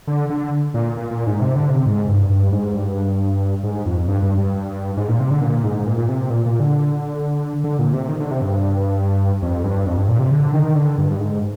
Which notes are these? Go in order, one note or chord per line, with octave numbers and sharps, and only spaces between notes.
D3
D3
A#2
A#2
A#2
G#2
C3
D3
C3
G#2
G2
G2
G#2
G2
G#2
F2
G2
G2
G2
G#2
A#2
C3
D3
A#2
G#2
A#2
A#2
C3
A#2
A#2
D3
D3
A#2
C3
D#3
D3
C3
G2
F2
G2
F2
G2
A#2
C3
D3
D#3
D3
G2
G2
G#2